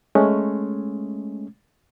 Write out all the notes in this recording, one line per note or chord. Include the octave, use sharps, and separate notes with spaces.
G#3 A3 C#4